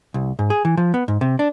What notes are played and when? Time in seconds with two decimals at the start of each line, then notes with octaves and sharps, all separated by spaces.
0.14 C2
0.39 G#2
0.50 G#4
0.65 E3
0.77 F3
0.94 B3
1.08 G#2
1.21 C3
1.39 D4